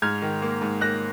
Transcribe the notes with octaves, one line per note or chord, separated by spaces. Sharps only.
G#2 F6 G#6
D#3
A#3
G#2
A#3 F#6 A#6